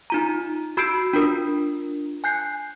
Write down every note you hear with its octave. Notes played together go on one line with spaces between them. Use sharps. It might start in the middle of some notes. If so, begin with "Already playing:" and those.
D#4 F4 A#5
F#4 B5 E6 G6 C7 D7
D4 F4 A#4
G#5 F#6 G6 C7